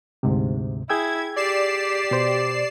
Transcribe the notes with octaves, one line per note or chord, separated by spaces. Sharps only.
D2 G#2 C3
E4 G#4 G5 E6 G#6
G4 D5 C7 E7
B2 C5